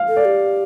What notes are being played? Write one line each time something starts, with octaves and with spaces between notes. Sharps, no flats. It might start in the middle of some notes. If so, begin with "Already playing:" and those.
Already playing: F5
A4
D5
G4